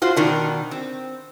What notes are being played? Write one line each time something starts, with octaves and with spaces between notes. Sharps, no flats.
F4 F#4 C5
B2 D#3 D4
C4